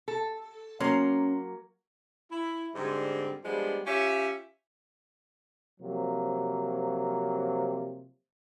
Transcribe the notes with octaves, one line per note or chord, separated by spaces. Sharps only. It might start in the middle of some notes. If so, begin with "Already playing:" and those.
A4
F#3 A#3 C#4 C6
E4
G#2 D3 G3 C4
F3 G3 G#3 B3 D4
C#4 F4 G4 C#5 E5
C3 F3 F#3 A#3